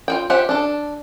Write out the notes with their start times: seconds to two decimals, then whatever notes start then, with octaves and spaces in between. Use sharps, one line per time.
0.08 F4 F#4 G5
0.30 F4 G4 C5 E5 F#5
0.49 D4 A4